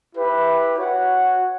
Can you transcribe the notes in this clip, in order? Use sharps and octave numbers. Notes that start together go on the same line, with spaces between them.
E4 G4 B4 E5
F#4 C#5 F#5